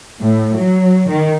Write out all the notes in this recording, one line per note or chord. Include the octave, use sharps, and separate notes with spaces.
A2
F#3
D#3